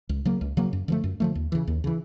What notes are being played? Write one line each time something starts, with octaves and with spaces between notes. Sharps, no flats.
C#2
C#3 F#3 A#3
C#2
C#3 F#3 A#3
F#2
D3 F3 A3
F#2
D3 F3 A3
D#2
C#3 E3
D#2
C#3 E3